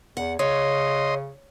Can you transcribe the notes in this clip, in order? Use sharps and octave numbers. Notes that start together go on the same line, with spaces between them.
E2 F#5
C#3 C#5 D#5 C6